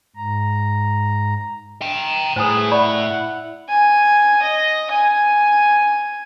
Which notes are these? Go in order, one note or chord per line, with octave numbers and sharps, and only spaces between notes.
G#2 A#5
G5 A#5
A2 G#4 B4 C5 G#5 D#6
E4 D5 F#5 B5 C#6
G#5
D#5
G#5